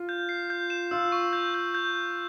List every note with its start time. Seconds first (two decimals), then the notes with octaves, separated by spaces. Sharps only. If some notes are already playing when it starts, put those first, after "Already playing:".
Already playing: F4
0.09 G6
0.29 C7
0.50 G6
0.70 E7
0.91 F4 E6
1.12 C#6
1.33 G6
1.54 G6
1.75 G6